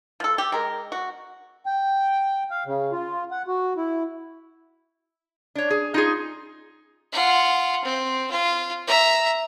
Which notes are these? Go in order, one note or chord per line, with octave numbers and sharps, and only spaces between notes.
F3 A4
G4
G#3 A#4
F#4
G5
F5
C#3
F4
F#5
F#4
E4
D4 C#5
G#4
D#4 F4 G#4
F4 F#5
C4
F4
E5 A#5